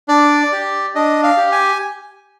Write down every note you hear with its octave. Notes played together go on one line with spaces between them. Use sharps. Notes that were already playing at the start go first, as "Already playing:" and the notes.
D4 D5
G4
D4 D#5
F5
G4
G#5